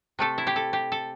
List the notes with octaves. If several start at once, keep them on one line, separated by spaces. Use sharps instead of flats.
C3 A3 A4
E4
G4
A4
G4
A4